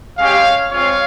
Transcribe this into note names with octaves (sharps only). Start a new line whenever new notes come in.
G#3 C#4 G4 C#5 F5
G#3 C4 F4 C#5 F5